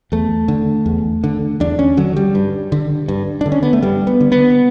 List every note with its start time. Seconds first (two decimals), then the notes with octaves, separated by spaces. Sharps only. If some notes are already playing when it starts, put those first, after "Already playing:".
0.12 E2 A3
0.48 D3
0.86 E2
1.24 D3
1.60 E2 D4
1.79 C#4
1.97 D3 F#3
2.16 G3
2.35 G2
2.72 D3
3.08 G2
3.41 D3 D4
3.52 C#4
3.63 B3
3.73 A3
3.83 G2 G3
4.07 B3
4.21 D3
4.32 B3